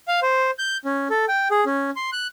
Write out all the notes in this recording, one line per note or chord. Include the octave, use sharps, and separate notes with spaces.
F5
C5
G6
C#4
A4
G5
G#4
C#4
C6
F#6